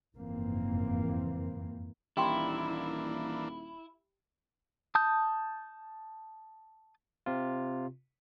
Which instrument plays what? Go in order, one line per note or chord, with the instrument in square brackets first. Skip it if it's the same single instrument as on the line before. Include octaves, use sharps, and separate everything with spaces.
[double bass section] F#1 F2 G#2 E3 A#3 C4
[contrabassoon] D#1 [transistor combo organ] E3 A#3 D4 [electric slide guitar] E4 [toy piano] G4 G5 C6
[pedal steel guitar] A5 D#6 G6
[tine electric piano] C3 F4